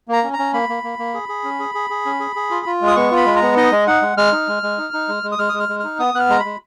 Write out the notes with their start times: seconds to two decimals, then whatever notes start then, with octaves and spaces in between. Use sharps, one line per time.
0.08 A#3 A#5
0.24 C#4
0.33 A#5
0.39 C#4
0.53 A#3 B5
0.69 A#3
0.83 A#3
0.99 A#3
1.14 G#4
1.29 G#4
1.44 C#4
1.60 G#4
1.75 G#4
1.90 G#4
2.05 C#4
2.20 G#4
2.36 G#4
2.50 F4
2.66 F4
2.81 G#3
2.87 D#6
2.96 B3 C#6
3.11 F4
3.16 B5
3.26 G#3
3.36 A#5
3.42 B3
3.57 D#4 D#5
3.72 G#3
3.87 D#4 F#5
4.02 G#3
4.17 G#3 F6
4.32 D#4
4.48 G#3
4.63 G#3
4.78 D#4
4.93 D#4
5.09 G#3
5.23 G#3
5.32 D#6
5.39 G#3 F6
5.49 G#3 D#6
5.60 F6
5.69 G#3
5.80 D#4 F6
5.99 B3 D#6
6.14 B3 F#6
6.20 F6
6.30 G#3 A#5
6.40 B5
6.45 G#3